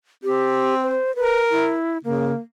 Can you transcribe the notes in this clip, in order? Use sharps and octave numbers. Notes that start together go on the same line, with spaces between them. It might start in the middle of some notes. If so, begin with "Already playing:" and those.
C4 G4
C5
A#4 B4
E4
C#3 A#3